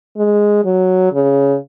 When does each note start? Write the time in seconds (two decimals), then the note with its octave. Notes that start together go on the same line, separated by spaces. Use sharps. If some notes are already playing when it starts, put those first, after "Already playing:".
0.17 G#3
0.65 F#3
1.13 C#3